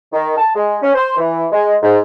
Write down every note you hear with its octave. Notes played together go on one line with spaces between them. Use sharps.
D#3
A5
G#3
C#4
C5
E3
G#3
G#2